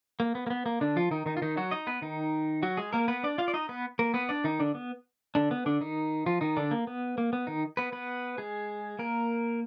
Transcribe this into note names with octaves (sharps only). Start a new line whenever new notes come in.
A#3
B3
A#3
B3
A#3
D3 D4
F3 F4
D#3 D#4
D#3 D#4
F4
D#3 D#4
F#3 F#4
D#4 D#5
B3 B4
D#3 D#4
F#3 F#4
G#3 G#4
A#3 A#4
B3 B4
D4 D5
F4 F5
D5
D#4 D#5
B3 B4
A#3 A#4
B3 B4
D4 D5
D#3 D#4
D3 D4
B3
D3 D4
B3
D3 D4
D#3 D#4
F3 F4
D#3 D#4
D3 D4
A#3
B3
A#3
B3
D#3 D#4
B3 B4
B3 B4
G#3 G#4
A#3 A#4